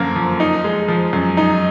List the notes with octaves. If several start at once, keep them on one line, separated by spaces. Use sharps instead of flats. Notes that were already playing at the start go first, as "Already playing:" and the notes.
Already playing: F#2 D3 F3 A#3
F3
D#4
G#3
F3
F#2
D#4